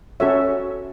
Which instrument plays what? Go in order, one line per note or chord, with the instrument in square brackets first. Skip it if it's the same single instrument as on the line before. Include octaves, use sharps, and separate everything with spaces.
[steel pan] C#4 F#4 A4 C#5 E5